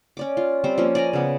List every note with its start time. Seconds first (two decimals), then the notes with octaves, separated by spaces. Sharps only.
0.17 C#4 D5 D6
0.37 F4
0.64 G3 C4 C5
0.78 F3 A#3 C#4
0.95 D5 G#5 A#5
1.13 C#3 B3